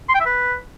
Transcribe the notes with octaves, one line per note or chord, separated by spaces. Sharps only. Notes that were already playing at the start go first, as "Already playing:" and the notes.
C6
G5
E5
B4